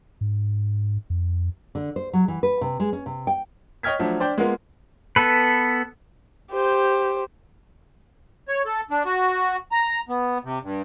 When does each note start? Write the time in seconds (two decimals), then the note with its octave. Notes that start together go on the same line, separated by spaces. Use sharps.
0.21 G#2
1.10 F2
1.75 D3
1.96 C5
2.13 F#3
2.28 E3
2.43 B4
2.61 C3
2.80 G#3
2.93 C#4
3.06 C3
3.27 G5
3.83 C#5 D#5 G5 F6 G#6 B6
4.00 F3 F#3 A3 D4
4.20 D4 C5 D5 G5
4.38 G#3 A#3 B3 F4 A#4
5.16 B3 A4 B4
6.52 G4 C5
8.48 C#5
8.65 A4
8.91 D4
9.05 F#4
9.72 A#5
10.09 B3
10.44 C3
10.63 G2